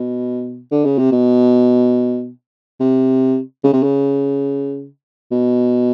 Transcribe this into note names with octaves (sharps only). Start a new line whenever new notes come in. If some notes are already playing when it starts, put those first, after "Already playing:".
Already playing: B2
D3
C#3
C3
B2
C3
C#3
C3
C#3
B2